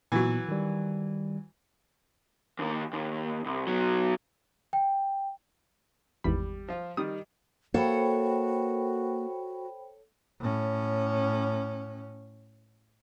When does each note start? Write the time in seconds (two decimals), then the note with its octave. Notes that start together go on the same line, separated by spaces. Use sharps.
0.12 A#2 E3 F#3 B3
0.49 D#3 G3
2.59 D#2 D#3
2.93 D#2
3.46 C2
3.67 B2 F#3
4.73 G5
6.24 G#1 E2 G3 B5
6.68 F3 F4
6.97 D#3 G3 D#6
7.74 A#3 F#4 A4 C5 C#5 F#5 G5 B5
10.40 A2 C#4